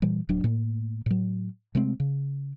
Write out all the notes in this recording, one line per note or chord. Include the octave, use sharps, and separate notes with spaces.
A#2 E3 G3
D1 F#3 D4
A2 A#3
A2 F#3
C3 G#3 A3 C4
C#3